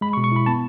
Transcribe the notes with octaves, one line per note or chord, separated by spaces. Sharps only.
G#3 B5
C#6
B2
C#6
E4 B5
B3 A5